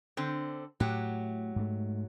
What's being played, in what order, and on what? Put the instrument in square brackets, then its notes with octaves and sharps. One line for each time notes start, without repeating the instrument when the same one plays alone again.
[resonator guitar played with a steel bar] D3 C4
[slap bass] A2 [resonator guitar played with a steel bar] F#3 G4
[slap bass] G#2 A3